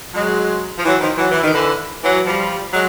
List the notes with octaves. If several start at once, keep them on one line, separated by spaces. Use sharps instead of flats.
F#3 G#3
F3
E3 F#3
D#3 F3
E3 F#3
E3
D#3
D3 E3
E3 F#3
F3 G3
F#3 G#3